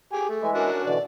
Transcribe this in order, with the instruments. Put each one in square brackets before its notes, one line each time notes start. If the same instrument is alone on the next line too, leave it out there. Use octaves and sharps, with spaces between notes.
[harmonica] G4 G#5 [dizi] G#4
[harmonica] A3
[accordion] E3 G#3 E4 [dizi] G#5
[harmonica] C#4 D4 F#4 [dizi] A#4
[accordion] B2 D3 E3 [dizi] D5